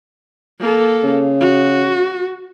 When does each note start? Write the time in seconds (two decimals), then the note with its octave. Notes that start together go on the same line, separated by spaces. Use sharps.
0.60 A#3 A4
1.04 C#3
1.41 F#4